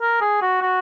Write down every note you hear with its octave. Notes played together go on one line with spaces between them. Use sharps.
A#4
G#4
F#4
F#4